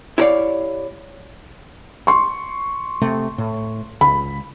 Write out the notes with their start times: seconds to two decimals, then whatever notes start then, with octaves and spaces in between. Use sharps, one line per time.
0.18 E4 G4 A#4 C#5 D5 F5
2.07 C6 C#6
3.01 C3 A3
3.38 A2
4.01 C#2 B5